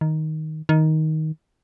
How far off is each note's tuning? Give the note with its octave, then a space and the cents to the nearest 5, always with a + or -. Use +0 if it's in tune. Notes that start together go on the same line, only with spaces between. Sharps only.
D#3 +5
D#3 +10